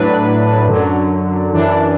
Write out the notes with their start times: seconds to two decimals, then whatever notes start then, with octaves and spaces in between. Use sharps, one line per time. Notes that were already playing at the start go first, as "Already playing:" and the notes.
Already playing: A2 F#3 D4 B4
0.66 F#2 D3 F#3
1.53 F#2 E3 D4